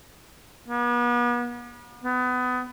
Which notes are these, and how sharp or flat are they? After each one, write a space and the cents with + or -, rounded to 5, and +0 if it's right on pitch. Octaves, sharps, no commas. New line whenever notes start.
B3 -40
B3 +25